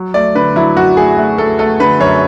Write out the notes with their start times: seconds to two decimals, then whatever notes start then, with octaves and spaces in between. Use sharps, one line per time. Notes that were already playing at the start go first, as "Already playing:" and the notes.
Already playing: F#3
0.14 A3 D5
0.35 D3 B4
0.56 F#3 E4
0.76 F#2 F#4
0.97 A3 G#4
1.18 A3
1.38 A3 A4
1.59 A3 A4
1.80 D3 B4
2.00 F#2 C#5